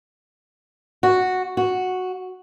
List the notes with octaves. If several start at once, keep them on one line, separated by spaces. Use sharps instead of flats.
F#4
F#4